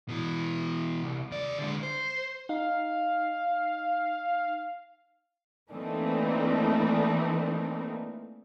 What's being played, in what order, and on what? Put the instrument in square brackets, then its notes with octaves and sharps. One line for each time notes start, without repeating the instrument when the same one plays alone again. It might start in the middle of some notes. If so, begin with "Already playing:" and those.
[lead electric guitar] B2 E3
C2
D#2 D5
D3 G#3
C5
[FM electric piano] D#4 [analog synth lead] F5
[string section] E3 A3 A#3 C4 D4 D#4